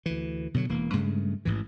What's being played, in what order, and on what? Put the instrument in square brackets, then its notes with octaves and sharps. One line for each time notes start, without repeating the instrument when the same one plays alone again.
[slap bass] D2 E3
B2 D3 F3 F#3
E1 E3 A#3
G2 C#3 G#3 A3
A1 G#2 E3